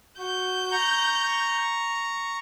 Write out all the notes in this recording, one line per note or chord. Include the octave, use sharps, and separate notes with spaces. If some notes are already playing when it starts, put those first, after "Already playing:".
F#4 G6
A#5 C#6